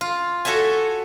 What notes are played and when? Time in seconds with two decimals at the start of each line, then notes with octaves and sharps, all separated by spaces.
0.01 F4
0.45 F#4 A4 C#5 E5 G#5